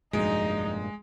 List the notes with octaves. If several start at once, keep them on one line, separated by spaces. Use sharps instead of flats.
F1 A#1 G2 A#2 G#3 D#4 F#4